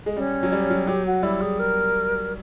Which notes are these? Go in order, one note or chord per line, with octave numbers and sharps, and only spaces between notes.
G#3
G3 C#4
F#3
G3
F#3
F#3 G4
F#4
G3 E4
G#4
A#4